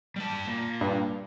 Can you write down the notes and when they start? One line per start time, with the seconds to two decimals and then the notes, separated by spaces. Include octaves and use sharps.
0.16 G3 A5
0.47 A#2
0.81 G2